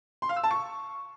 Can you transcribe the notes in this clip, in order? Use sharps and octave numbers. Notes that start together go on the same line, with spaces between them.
C6
F5
E6
A5
C#6